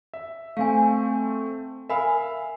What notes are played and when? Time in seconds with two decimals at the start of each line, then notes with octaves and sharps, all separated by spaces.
0.14 E5
0.57 A3 C4 F5 G#5
1.89 A#4 E5 F5 G#5 B5